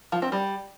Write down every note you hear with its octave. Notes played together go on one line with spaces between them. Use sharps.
F3
C4
G3